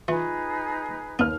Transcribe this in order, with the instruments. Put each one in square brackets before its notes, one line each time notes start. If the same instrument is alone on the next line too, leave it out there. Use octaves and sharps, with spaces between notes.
[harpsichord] E3 [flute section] D#4 G#4 B4 [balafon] F4
[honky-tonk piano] D#2 F6 [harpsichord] B3